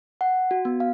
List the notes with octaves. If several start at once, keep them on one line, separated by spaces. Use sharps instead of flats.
F#5
F#4
B3
F5